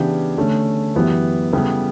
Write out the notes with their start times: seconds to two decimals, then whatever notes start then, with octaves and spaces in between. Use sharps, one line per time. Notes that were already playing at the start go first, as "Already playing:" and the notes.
Already playing: C#3 E3 B3 D4 G4
0.37 D3 A3 C#4
0.95 F#2 E3 B3 E4 G4
1.53 C#3 G3 B3 E4 A4